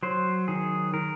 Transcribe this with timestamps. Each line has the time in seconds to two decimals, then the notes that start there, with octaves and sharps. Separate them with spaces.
0.03 F#3 C5
0.48 D#3 G#4
0.94 D#3 A#4